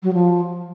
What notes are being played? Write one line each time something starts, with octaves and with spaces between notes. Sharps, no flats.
F#3
F3